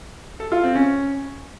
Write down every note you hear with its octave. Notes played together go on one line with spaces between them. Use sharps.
A4
F4
C4
C#4